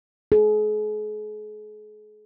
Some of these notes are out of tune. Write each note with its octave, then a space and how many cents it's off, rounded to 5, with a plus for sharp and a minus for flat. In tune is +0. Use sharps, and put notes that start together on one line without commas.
G#4 +40